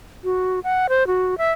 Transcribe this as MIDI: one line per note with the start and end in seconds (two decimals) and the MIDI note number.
0.24 0.60 66
0.64 0.87 78
0.89 1.07 72
1.07 1.38 66
1.38 1.52 76